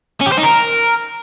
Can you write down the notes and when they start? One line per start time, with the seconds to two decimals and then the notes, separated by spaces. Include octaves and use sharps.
0.21 C#4
0.27 G4
0.32 C5
0.38 D#4
0.43 A#4